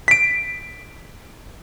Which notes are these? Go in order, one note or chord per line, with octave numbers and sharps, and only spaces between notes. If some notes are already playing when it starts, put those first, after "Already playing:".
B6 D7